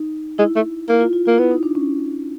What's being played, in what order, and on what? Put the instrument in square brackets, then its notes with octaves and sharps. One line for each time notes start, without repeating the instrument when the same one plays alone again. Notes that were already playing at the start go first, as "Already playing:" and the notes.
Already playing: [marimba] D#4
[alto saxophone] G#3 [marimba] E4
[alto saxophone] A3
[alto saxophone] A#3 [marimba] E4
[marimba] F4
F4
[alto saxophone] A#3 [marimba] F4
[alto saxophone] B3 [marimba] E4
[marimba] D#4
D4
C#4